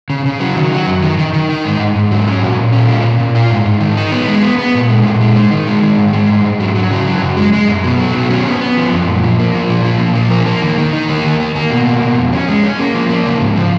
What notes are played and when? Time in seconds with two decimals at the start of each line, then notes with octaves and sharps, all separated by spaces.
0.10 C#3
0.25 C#3
0.40 F#3
0.57 D#3
0.72 F#3
0.87 F#2
1.03 D#3
1.18 D#3
1.33 D#3
1.49 D#4
1.65 G#2
1.80 G#2
1.96 G#2
2.11 F#3
2.27 C#4
2.42 A#2
2.57 A#2
2.72 C#4
2.88 F4
3.04 A#2
3.20 A#2
3.35 F4
3.50 G#2
3.65 G#2
3.81 D#3
3.97 D#4
4.12 B3
4.28 G#3
4.43 B3
4.58 B3
4.75 A#2
4.89 G#3
5.05 A#2
5.21 G#3
5.36 D#4
5.51 D#3
5.67 G#3
5.83 D#3
5.98 G#2
6.13 G#3
6.30 G#2
6.44 G#2
6.60 F#3
6.75 F#3
6.91 C#3
7.07 F#3
7.22 F#2
7.37 G#3
7.53 G#3
7.68 F#2
7.83 B2
7.99 F#3
8.15 B2
8.30 C#4
8.46 B3
8.61 B3
8.77 F3
8.92 F#2
9.08 A#2
9.23 F3
9.39 A#3
9.55 F3
9.70 A#2
9.85 F3
10.00 A#2
10.15 F3
10.31 A#3
10.46 A#3
10.62 D#3
10.78 D#3
10.93 D#4
11.09 A#3
11.24 D#3
11.40 A#3
11.55 A#3
11.70 B2
11.86 A#3
12.02 B2
12.17 F2
12.33 C#4
12.48 G#3
12.64 C#4
12.79 A#3
12.95 F3
13.10 A#3
13.26 C#3
13.41 G#2
13.56 F3